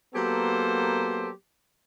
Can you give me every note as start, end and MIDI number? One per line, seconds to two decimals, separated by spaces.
0.15 1.31 54
0.15 1.31 58
0.15 1.31 59
0.15 1.31 67
0.15 1.31 69
0.15 1.31 72